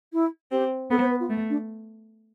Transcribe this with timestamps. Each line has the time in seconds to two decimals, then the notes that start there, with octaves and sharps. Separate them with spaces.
0.13 E4
0.51 C4 G4
0.91 B3 A4
1.00 C5
1.10 B4
1.20 F4
1.30 A3
1.50 D4